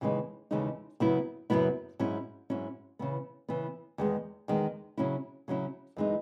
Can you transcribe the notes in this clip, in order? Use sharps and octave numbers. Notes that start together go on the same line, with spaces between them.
D#2 C#3 E3 G#3 D#4
D#2 C#3 E3 G#3 D#4
F#2 C#3 F#3 B3 E4
F#2 C#3 F#3 B3 E4
G#2 F#3 C#4 E4
G#2 F#3 C#4 E4
C#3 E3 B3
C#3 E3 B3
E2 D#3 G#3
E2 D#3 G#3
C#3 F#3 C#4 E4
C#3 F#3 C#4 E4
F#2 E3 G#3 D#4